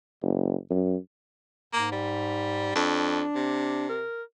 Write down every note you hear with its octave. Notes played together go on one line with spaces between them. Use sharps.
F#1
F#2
G#2 A#3
G3
F2 D4
C3
A#4